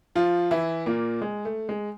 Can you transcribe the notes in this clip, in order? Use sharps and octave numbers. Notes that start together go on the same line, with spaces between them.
F3 F4
E3 E4
A#2 A#3
G#3
A3
G#3